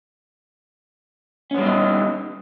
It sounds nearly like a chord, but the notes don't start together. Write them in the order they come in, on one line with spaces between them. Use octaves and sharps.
C#4 B3 G3 E4 D#4